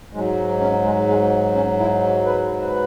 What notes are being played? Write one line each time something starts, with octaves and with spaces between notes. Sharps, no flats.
G#2 F#3 G#3
C#4
G#3
G#3
C#4
E4
B4
B4